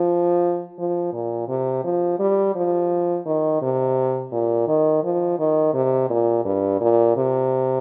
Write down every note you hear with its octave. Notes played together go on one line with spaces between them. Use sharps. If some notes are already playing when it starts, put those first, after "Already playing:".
Already playing: F3
F3
A#2
C3
F3
G3
F3
D#3
C3
A#2
D#3
F3
D#3
C3
A#2
G2
A#2
C3